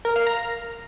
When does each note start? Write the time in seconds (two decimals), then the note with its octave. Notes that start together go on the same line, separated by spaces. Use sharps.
0.05 A#4
0.16 F5
0.27 A#5